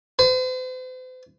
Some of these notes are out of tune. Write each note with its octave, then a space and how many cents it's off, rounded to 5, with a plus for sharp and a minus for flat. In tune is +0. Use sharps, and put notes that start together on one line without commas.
C5 -45